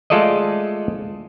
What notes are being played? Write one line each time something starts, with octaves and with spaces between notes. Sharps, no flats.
G#3 A3 F4 A4 D5 D#5